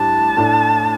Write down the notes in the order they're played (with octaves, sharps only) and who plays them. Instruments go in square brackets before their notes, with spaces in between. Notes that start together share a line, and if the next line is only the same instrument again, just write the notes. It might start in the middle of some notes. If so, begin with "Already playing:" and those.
Already playing: [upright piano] A2 G3 D4 [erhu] A5
[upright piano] A2 A3 D4